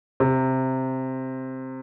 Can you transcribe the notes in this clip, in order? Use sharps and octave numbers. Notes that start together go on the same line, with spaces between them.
C3